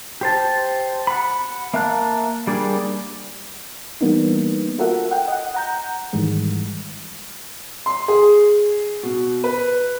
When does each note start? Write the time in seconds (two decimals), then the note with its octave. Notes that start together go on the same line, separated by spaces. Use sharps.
0.21 G4 C5 A5
1.07 F#5 B5
1.74 A#3 E5 F5 A5 F#6
2.47 G3 A#3 D4 G#4
4.01 E3 G3 A#3 B3 D4 D#4
4.79 F4 F#4 A4 A#4 E5 F#5
5.11 F#5 G5
5.28 D#5 F#5
5.54 F#5 A#5 G6
6.13 G#2 D#3 E3 G3 G#3
7.86 C6
8.08 G#4
9.03 B2
9.44 B4